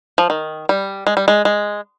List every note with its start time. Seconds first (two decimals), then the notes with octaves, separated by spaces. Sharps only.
0.18 F3
0.30 D#3
0.69 G3
1.07 G#3
1.17 G3
1.28 G#3
1.45 G#3